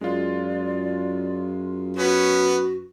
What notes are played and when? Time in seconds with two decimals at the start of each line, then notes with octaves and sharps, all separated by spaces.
0.01 F#2 G#3 F4 D5
1.97 B3 C#4 F#4